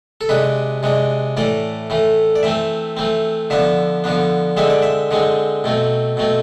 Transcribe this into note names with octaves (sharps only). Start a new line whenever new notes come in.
A4
C3 G#3 D4 B4
C3 G#3 D4
A2 E3 A3 D5
A2 E3 A3
D5
E3 A3 C4 E5
E3 A3 C4
D3 F3 B3 D4 E5
D3 F3 B3 D4
D3 G#3 C4 E5
D5
E5
D3 G#3 C4
B2 A3 C4
B2 A3 C4